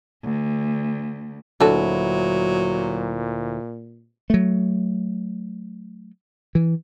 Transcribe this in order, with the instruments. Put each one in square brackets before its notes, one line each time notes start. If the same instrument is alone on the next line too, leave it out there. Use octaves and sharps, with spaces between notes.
[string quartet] D2
[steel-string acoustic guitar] D2 E4 [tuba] A#2 [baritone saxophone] F#3 [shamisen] D4 F#4 A4
[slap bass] F#3 A3
E3